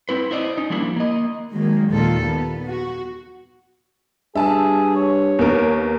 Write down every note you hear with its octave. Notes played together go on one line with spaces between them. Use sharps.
C4 E4 B4
E4 C5 D5 D#5
C#4 D#4
F3 G3 A#3 D4 E4
A#3 D#5
D#3 F#3 G#3 A#3
D#2 A#2 D#3 F4 A4
B3
F#4
G2 G#4 E5 A5
C#5
D#2 B3 A#4